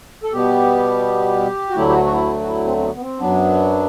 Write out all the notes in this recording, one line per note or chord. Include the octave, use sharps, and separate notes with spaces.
A4
B2 G3 B3 G4
F#4
D2 D3 F#3 A3 E4
G4
F#4
F#4
E4
F#4
E4
C4
C4
B3
B3
C4
F#2 F#3 B3 D4